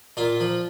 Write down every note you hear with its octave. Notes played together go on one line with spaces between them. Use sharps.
A#2 F4
F3